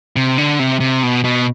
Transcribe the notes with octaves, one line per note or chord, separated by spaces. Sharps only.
C3
D3
C3
C3
B2
B2